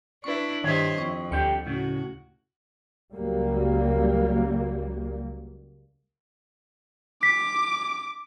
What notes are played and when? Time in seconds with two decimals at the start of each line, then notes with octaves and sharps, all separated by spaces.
0.24 D4 E4 B4 C#6
0.64 G2 D#3 C5 C#5 D#5 E5
0.98 F2 C#6
1.31 D2 D3 G3 G4 C#7
1.66 A2 C#3 F#4
3.14 C#2 F#3 G3 A#3
7.23 D6 B6